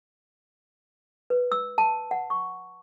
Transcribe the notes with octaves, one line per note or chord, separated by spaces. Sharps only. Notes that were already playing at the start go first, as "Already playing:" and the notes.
B4
E6
A5
F#5
C#6